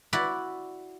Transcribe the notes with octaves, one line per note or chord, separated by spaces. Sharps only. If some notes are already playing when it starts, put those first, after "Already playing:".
E4 F#4 D5 B5